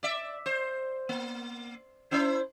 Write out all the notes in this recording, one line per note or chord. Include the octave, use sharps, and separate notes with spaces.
D5 E5
C5
A#3
C#4 E4 C5